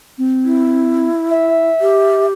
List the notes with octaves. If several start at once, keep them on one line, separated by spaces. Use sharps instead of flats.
C4
E4
E5
G4